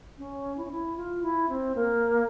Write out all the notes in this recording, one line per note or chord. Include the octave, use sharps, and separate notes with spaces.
C#4
E4
C#4
E4
F4
E4
C4
A#3